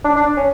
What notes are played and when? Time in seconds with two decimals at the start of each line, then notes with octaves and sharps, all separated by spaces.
0.04 D4
0.16 D4
0.37 C#4